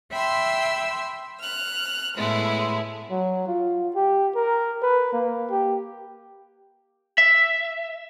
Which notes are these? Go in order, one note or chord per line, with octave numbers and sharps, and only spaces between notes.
E5 G5 B5 C6 E6
F6 F#6
A2 G#3 A3 B3 E4
F#3
F4
G4
A#4
B4
A#3
G4
E5